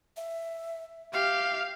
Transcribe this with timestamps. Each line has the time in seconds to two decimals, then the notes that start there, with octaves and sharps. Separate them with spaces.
0.17 E5
1.13 G4 E5 F5